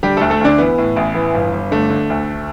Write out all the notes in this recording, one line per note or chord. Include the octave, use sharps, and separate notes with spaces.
D3 G3 G4
D2 A3 A4
A3 A4
D2 D3 D4
E3 B3
A2
A1
E3
G1
G1
D3 A3
D3
D2